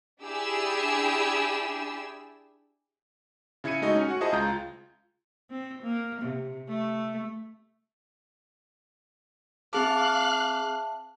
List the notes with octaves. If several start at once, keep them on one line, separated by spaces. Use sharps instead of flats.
D4 E4 G4 G#4 E6
C#3 E4 G#6 C#7 D#7
G#3 A3 D#4 F#4 D#5
C#4 G#5
F#4 F#5
E4 F4 G#4 C5 D#5 A5
C#2 G#3 F4 A#5 G6
C4
A#3
C3
A3
C4 G#4 E5 F5 A5 D6 F#6